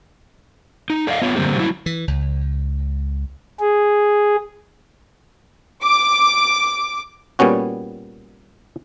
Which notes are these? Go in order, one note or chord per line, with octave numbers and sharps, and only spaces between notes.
D#4
A4 D5 D#5 F5
B3 F4 C#5
D3 G3 A#3 C4 G4
F#3 G3 E4
E3
C#2
G#4
D6
A#2 G3 B3 C#4 F#4